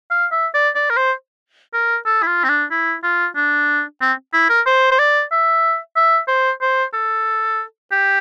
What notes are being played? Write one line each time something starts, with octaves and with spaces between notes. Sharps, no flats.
F5
E5
D5
D5
A#4
C5
A#4
A4
E4
F4
C4
D4
E4
F4
D4
C4
E4
A#4
C5
C5
D5
E5
E5
C5
C5
A4
G4